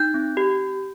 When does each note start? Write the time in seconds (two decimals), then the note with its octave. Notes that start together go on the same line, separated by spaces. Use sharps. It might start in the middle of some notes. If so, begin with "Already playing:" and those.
Already playing: D#4 G6
0.14 C4
0.37 G4